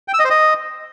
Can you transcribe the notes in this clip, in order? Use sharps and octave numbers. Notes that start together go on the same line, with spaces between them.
G5
E6
D#5
C5
D#5